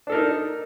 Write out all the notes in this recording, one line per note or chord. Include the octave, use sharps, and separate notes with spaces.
D4 D#4 A4 A#4